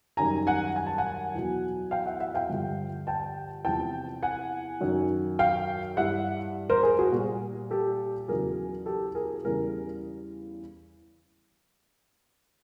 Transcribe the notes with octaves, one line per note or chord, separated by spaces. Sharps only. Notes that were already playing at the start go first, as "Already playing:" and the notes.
F#2 D#3 G3 G#5 A#5
F#5 G#5
G#5
A5
F#5 G#5
E2 B2 F#3
F5 G5
E5 F#5
E5 F#5
F5 G5
G2 D3 F3
G5 A5
E2 C3 F3 G5 A5
F#5 G#5
F#2 D#3 F#3
F5 G5
G2 E3 G3 E5 F#5
A#4 C5
G#4 A#4
F#4 G#4
A#2 G3
G4 A4
E2 C#3 F#3 G#4 A#4
G4 A4
G#4 A#4
E2 C#3 E3 G3 G#4 A#4